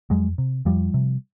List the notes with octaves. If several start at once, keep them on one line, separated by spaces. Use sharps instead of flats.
F2 F#3 G#3
C3
F2 F3 G3
C3